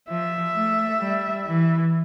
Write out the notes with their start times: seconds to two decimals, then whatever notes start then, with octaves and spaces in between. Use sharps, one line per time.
0.09 F3 E5
0.55 A3
1.00 G3
1.46 E3